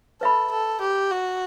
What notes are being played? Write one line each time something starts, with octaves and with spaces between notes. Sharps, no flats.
A4 B4 E5 B5
A4
G4
F#4